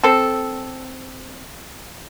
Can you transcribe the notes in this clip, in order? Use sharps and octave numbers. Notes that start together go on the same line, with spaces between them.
C4 A4